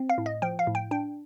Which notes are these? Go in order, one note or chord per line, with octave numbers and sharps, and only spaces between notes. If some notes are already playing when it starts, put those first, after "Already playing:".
Already playing: C4
F5
A2
D#5
F3 G5
F5
A2
G5
D4 G5